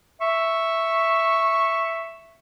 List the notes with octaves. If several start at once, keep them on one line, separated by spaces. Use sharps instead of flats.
E5 C#6